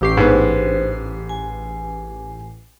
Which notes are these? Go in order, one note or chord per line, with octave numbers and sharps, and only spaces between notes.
A1 C#4 G4 E6 C7
G#2 B3 D4 C5
G#5